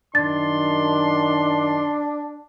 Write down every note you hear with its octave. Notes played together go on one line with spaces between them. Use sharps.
F#2 D#3 D4 C6 A6